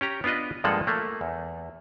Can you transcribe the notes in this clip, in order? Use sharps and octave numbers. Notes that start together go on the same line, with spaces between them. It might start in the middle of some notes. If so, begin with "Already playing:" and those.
C#4 G4 A#5
B3 D4 F4 B4 D#5
G2 F3 G#3 A#3 A4 F#5
A3 A#3
E2